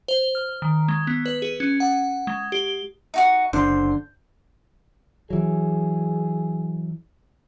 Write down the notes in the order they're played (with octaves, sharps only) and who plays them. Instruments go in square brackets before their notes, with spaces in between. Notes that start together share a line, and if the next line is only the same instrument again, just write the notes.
[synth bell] C5
F6
D#3
G#3
B3
B4
G#4
C#4
F#5
G#3
G4
[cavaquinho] D#4 F#4 F#5
[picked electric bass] F#1 D3 D4 [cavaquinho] C5
[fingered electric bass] E3 F#3 [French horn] G#4